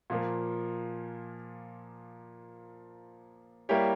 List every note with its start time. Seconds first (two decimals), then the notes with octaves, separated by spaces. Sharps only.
0.10 A#2 F3 A#3
3.69 G3 A#3 E4 G4 C#5